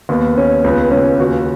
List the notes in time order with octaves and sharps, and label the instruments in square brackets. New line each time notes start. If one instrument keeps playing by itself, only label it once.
[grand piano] D#2 B3
D#2 C#4
C#2 B3
C#2 C#4
D#2 F#4